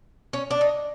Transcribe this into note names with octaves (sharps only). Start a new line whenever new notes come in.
C#4
D4
D#4